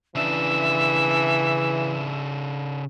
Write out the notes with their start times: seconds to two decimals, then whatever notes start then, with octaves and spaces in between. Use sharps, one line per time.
0.15 C#3 E3 D4 E5